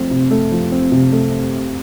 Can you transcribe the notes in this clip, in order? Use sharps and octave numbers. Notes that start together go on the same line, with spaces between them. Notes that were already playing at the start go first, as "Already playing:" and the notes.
Already playing: F3 A3 C4
C3
A3
F3
C4
C3
A3